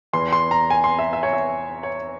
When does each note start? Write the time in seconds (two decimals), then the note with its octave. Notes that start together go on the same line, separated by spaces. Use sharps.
0.13 E2 E3 C6
0.33 C6
0.51 A#5
0.70 G#5
0.84 C6
0.99 E5
1.13 E5
1.23 C#5
1.33 E5
1.83 C#5